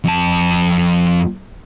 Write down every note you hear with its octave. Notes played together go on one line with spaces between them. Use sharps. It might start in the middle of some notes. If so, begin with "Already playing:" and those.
F2 A5